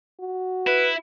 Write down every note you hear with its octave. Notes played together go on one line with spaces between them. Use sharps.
F#4
E4 B4